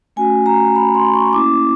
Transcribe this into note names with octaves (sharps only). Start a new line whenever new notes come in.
A3 C#4 F#4 G#5
A#5
B5
C6
C#6
A#3 C#4 E4 D6